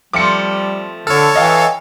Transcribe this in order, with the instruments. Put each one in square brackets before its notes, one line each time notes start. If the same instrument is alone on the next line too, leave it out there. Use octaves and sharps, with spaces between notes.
[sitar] F3 A3 C4 [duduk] G3 [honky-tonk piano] D6 C#7
[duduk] D3 [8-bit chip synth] A4 C#5 [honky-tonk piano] F6
[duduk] E3 [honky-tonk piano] D#5 F5 G5